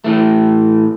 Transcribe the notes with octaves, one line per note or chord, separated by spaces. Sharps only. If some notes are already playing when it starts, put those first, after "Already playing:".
A2 E3 A3